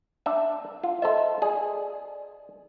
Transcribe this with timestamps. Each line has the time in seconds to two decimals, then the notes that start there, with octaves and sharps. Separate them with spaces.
0.26 D4 E5
0.83 F4
1.02 A4 C5 D#5 E5
1.42 G#4 D5